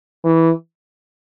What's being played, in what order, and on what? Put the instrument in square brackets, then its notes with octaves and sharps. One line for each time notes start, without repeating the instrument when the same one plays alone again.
[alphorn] E3